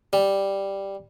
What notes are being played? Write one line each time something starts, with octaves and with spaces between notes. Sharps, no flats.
G3